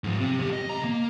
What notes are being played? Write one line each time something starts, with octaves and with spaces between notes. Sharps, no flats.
G#2 F3
C3
F2 G4
D#5
C#2 A#5
A#3